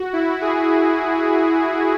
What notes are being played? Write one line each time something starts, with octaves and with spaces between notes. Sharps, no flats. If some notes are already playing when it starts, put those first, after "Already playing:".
Already playing: F#4
E4
G#4